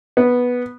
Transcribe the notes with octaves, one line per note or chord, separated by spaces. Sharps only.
B3